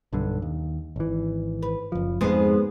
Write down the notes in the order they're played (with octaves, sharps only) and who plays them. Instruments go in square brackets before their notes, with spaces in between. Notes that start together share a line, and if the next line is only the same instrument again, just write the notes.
[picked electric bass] B1 G2 D3
D#2
G#1 E3
[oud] B4
[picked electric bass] F#1 F3
[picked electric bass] F2 G#2 [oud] G#3 B3 C5